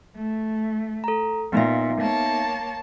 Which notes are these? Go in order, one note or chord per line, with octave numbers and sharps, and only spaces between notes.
A3
A4 A#5
A#2 B3 D#4 E5
A#3 C#5 A5